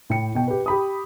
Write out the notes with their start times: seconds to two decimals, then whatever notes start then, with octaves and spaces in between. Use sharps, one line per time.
0.10 A2 G5 C#7
0.35 B2 G5
0.48 G4 B4
0.66 G4 B5 D#6